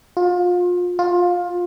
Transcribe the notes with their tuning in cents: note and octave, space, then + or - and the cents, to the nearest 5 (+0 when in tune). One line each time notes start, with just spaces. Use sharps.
F4 +30
F4 +20